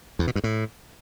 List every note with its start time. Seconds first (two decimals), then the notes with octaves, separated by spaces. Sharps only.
0.19 E2
0.27 B2
0.35 G2
0.44 A2